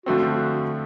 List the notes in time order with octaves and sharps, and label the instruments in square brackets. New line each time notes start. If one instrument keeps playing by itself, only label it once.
[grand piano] D3 F3 A3 C4 [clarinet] F#4
[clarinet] F#4